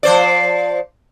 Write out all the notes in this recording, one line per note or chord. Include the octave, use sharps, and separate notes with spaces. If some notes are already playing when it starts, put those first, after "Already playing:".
F3 C5 D5